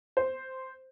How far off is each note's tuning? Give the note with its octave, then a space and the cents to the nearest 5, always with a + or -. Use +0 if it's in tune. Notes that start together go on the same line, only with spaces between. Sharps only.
C5 -5